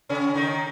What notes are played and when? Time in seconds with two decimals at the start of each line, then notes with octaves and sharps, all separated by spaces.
0.09 C#3 C#4
0.35 D#3 D#4